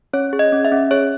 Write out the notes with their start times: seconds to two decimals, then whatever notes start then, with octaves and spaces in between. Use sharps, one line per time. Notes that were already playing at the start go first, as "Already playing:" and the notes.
0.13 C#4 C#5
0.33 G#4
0.39 D#5
0.52 C#4
0.65 E5
0.72 C#4
0.91 G#4 C#5